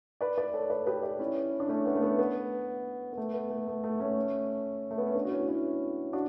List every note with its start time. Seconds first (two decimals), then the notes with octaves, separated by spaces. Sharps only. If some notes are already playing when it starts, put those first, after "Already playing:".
0.21 B4 D5
0.38 B4 D5
0.54 A4 C#5
0.70 B4 D5
0.87 G4 B4
1.03 B4 D5
1.19 C#4 E4
1.60 D4
1.69 A3 C#4
1.86 B3
1.95 A3
2.02 B3
2.19 B3
3.13 B3
3.17 A3
3.34 B3
3.50 A3
3.67 A3
3.84 A3
4.00 A3 C#4
4.91 A3
4.98 B3
5.07 C#4
5.15 B3 D4
5.25 F#4
5.31 C#4 E4
5.48 C#4 E4
6.13 D4 F#4